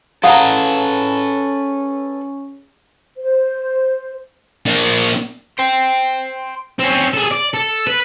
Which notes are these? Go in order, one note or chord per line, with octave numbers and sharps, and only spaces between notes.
C#4 G#4 A4 B4 F5 F#5 A#5
C5
A#3 D4
C5 G5
C4 C#4
G#4 A4
D5
A4
B4